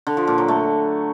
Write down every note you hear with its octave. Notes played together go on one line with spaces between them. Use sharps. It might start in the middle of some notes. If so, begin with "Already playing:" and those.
D3
F3
A#2
F#3
A3